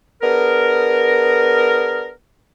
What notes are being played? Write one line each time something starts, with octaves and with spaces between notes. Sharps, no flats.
B3 D4 G#4 A#4